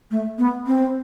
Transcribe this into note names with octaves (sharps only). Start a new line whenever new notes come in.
A3
B3
C4